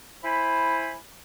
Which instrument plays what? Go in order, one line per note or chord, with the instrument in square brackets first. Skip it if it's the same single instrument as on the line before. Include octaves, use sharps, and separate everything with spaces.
[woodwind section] E4 C5 G#5 B5